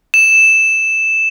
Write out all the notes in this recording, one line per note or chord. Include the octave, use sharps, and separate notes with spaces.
E7